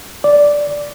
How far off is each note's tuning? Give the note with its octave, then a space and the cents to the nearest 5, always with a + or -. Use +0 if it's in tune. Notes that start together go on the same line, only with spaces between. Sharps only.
D5 -5